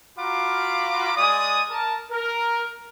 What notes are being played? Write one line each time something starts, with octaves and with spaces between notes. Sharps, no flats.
F4 F#4 F5 A#5 B5 D6
G#3 D5 G#5 D#6
A#4 A5
A#4